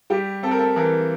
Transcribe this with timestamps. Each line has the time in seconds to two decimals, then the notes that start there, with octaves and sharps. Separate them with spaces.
0.10 G3 G4
0.43 C4 A4
0.51 A#4
0.59 A4
0.76 E3 A#4